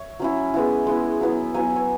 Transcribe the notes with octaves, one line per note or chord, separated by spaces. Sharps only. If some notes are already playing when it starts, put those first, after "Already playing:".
Already playing: C#5 E5
F#3 C#4 E4
G#3 B3 E4
G#3 B3 E4
F#3 B3 E4
F#3 B3 E4 G#5
E5
C#5